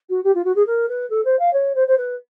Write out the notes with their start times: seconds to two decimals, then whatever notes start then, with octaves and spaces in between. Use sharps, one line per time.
0.09 F#4
0.23 G4
0.34 F4
0.44 F#4
0.55 G#4
0.66 A#4
0.88 B4
1.10 A4
1.25 C5
1.39 F5
1.53 C#5
1.75 C5
1.87 C5
1.97 B4